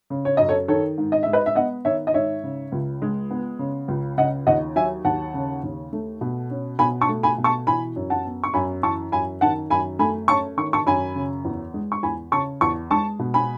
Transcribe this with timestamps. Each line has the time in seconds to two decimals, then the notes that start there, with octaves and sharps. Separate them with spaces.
0.10 C#3
0.25 C#5
0.37 F#2 D#5
0.48 A4 C#5
0.68 D#3 A4 C#5
0.98 G#2
1.12 D#5
1.23 G#3 E5
1.33 B4 D#5
1.46 E5
1.55 B3 D#5 F#5
1.85 D#3 C#5 E5
2.07 D#5
2.14 G#2 C#5 E5
2.44 C#3
2.72 C#2
3.02 G#3
3.31 B3
3.59 C#3
3.88 C#2
4.18 C#3 D#5 F#5
4.47 D#2 D#5 F#5
4.76 F#3 E5 G#5
5.05 D#2 F#5 A5
5.34 C#3
5.63 D#2
5.93 A3
6.21 B2
6.51 C#4
6.79 B2 G#5 B5
7.01 A5 C#6
7.09 A3
7.23 G#5 B5
7.38 B2
7.44 A5 C#6
7.67 E3 G#5 B5
7.96 F#2
8.10 F#5 A5
8.25 B3
8.44 C#6
8.54 F#2 G#5 B5
8.83 E3 A5 C#6
9.12 F#2 G#5 B5
9.41 D#3 F#5 A5
9.70 F#2 G#5 B5
9.99 A3 G#5 B5
10.28 C#4 A5 C#6
10.57 D#3 C#6
10.73 A5 C#6
10.86 F#2 G#5 B5
11.16 C#3
11.45 E2
11.74 G#3
11.92 C#6
12.03 E2 G#5 B5
12.32 C#3 A5 C#6
12.61 E2 A5 C#6
12.90 G#3 A5 C#6
13.19 B2
13.34 G#5 B5